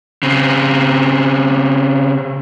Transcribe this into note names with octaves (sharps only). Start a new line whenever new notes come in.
C#3 C4